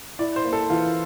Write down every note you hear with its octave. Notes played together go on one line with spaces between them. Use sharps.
E4 D5
C5
A#3
A4
E3 F4